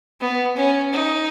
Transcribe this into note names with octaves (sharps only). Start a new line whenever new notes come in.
B3
C#4
D#4